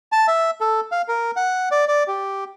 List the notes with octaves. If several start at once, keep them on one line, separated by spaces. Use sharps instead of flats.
A5
E5
A4
F5
A#4
F#5
D5
D5
G4